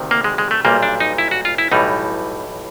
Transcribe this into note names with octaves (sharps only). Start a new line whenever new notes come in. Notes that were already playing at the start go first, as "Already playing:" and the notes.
Already playing: D2 C3 D#3
A#3
G#3
G#3
A3
B1 A#2 G3 A#3
D4
D#4
E4
F#4
F4
E4
B1 A2 E3 G3 D#4